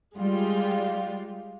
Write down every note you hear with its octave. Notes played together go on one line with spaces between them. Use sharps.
G3 G#3 F4 G4